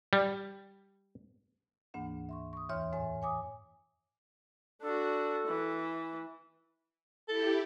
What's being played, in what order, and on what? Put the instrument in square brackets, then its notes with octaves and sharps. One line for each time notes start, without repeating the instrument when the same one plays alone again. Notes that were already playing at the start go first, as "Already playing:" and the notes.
[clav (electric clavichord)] G3
[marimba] D2 G#2 E3 A#3 D4 F#5
E5 C6 C#6
C#6 D#6
E2 E3 C#5 E5 C6 F6
F#2 A2 C#5 E5 G#5
F#2 C#5 G#5 D6 D#6
[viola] D4 F#4 [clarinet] A4
[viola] E3
[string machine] E4 G4 [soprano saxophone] A4